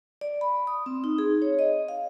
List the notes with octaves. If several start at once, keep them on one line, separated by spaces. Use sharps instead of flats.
D5
B5
D#6
C4
D#4
G#4
C#5
D#5
F5